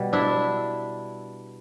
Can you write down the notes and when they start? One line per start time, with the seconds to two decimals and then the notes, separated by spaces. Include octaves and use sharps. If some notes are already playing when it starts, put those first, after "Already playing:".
Already playing: B2 G3
0.13 D4 E4